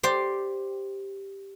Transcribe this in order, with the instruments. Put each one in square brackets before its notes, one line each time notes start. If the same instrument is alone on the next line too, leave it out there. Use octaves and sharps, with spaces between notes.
[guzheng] G4 C5 D5 G5